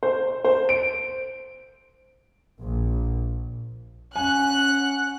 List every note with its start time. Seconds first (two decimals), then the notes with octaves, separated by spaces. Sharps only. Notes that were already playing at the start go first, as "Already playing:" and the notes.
0.03 C5
0.45 C5
0.69 D7
2.62 A#1
4.16 C#4 F#5 G#5 F#6